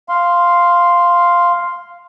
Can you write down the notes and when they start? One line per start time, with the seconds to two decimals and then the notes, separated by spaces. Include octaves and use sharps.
0.09 F5 C6